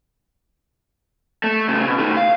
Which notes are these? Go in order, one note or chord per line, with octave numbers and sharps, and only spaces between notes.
A3
A2 C#3
B2
D#3 A3
F5